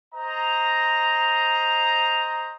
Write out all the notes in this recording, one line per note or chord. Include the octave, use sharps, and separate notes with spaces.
C5 D#5 A#5